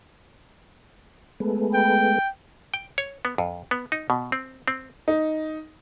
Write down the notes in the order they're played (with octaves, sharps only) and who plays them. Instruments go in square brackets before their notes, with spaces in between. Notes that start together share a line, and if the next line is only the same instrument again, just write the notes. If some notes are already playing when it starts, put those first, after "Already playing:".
[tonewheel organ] G#3 A3 B3
[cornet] G5
[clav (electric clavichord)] G5
C#5
B3
F2
B3
D#4
B2
C4
C4
[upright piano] D#4